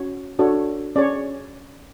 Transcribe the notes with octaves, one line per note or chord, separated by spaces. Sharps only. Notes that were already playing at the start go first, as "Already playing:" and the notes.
Already playing: C#4 F#4 C#5
D4 F#4 A4 C#5
C#4 G#4 C#5 D5